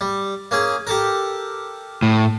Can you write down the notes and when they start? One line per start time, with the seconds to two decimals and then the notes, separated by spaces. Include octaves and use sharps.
0.01 G3
0.51 A#3 C#4 G#4
0.87 G4 A4 A#4
2.02 A2